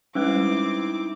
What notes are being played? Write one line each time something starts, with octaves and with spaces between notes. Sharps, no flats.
G3 G#3 C4 C#4 D#4 E4 B4 D6